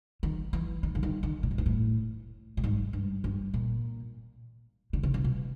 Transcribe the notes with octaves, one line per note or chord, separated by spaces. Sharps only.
D#3
E3
D#3
D3
D#3
D#3
A#2
A2
G#2
A2
A2
G#2
G2
G2
A#2
D3
C#3
C3
B2